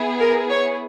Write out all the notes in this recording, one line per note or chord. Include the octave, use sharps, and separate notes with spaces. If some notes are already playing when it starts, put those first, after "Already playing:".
Already playing: B3 E4 G#4
A#4
C#5